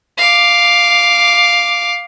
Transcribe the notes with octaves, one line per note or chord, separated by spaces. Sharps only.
F5 D6